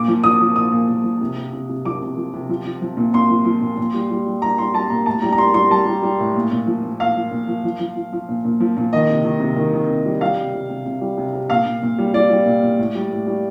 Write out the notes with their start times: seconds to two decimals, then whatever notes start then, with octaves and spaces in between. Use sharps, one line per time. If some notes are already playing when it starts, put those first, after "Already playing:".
Already playing: A#2 D6
0.08 F3
0.24 F3 D#6
0.41 F3
0.56 A#2 D#6
0.72 A#2
0.88 A#2
1.04 F3
1.21 C3
1.37 C3
1.53 C3
1.69 C3
1.85 F3 D6
2.01 C3
2.17 F3
2.34 C3
2.49 F3
2.65 F3
2.82 F3
2.97 A#2
3.13 A#2 C6
3.30 F3
3.45 F3
3.61 A#2
3.77 A#2
3.94 G3
4.11 G3
4.26 G3
4.42 G3 A#5
4.58 G3 C6
4.74 G3 A5
4.90 A#2 A#5
5.06 A2 A5
5.22 G3 A#5
5.32 A#5
5.38 G3 C6
5.54 G3 C6
5.70 G3 A5
5.87 G3
6.03 G3
6.20 A2
6.35 A#2
6.52 A#2
6.67 F3
6.83 A#2
7.00 A#2 F5
7.16 F3
7.31 A#2
7.48 F3
7.64 F3
7.80 F3
7.96 F3
8.12 F3
8.29 A#2
8.45 A#2
8.60 F3
8.77 A#2
8.93 D#3 D#5
9.09 C3
9.24 D#3
9.40 C3
9.56 D#3
9.73 D#3
9.89 C3
10.05 G3
10.21 G3 F5
10.37 C3
10.54 C3
10.70 C3
10.86 C3
11.01 G3
11.17 C3
11.34 C3
11.50 A#2 F5
11.66 A#2
11.82 A#2
11.98 G3
12.14 G3 D5
12.30 G3
12.46 A#2
12.62 A#2
12.78 A2
12.95 G3
13.11 A2
13.27 G3